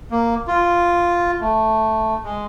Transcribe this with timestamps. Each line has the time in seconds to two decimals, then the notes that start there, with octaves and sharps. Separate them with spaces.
0.11 A#3
0.48 F4
1.41 A3
2.24 G#3